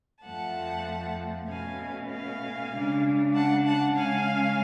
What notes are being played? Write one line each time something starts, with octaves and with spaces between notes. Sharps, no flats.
F2 F3 A3 F#5 A5
B2 A3 C#4 F5 G#5
F5 G#5
C#3 G#3 D4
F#5 A5
F#5 A5
C#3 G#3 C#4 F5 G#5